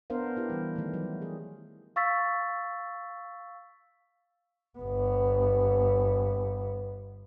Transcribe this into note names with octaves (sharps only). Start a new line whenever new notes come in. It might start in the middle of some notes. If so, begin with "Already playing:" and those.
B3 D4 A#4 C5 F5
B3 E4 G4
E3 G3
D#3 A3
F#3
G#4
F5 C#6 E6 A6 B6
G1 B3